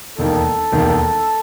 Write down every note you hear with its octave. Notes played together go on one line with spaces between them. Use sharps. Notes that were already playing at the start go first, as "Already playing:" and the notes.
E1 D#2 D#3 A4
E1 D#2 D#3